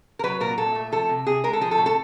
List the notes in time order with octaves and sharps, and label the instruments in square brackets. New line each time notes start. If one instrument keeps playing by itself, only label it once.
[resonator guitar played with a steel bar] A#4
F#3 B4
A#2 A#4
A#2 A4
A3
F3 A4
C3
C3 G#4
G#3 A#4
A4
F3 G#4
A4
A2
A4